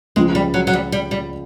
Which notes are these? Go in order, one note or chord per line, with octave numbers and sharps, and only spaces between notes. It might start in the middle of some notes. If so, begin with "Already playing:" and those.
C#2 C#3 F3 G#3
G3
F#3
F#3
G3
G3
G3